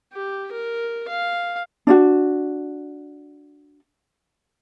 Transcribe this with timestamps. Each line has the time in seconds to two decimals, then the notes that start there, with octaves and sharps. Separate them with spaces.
0.13 G4
0.52 A#4
1.09 F5
1.87 D4 E4 F#4